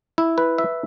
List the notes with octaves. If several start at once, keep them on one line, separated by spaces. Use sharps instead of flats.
E4
B4
E5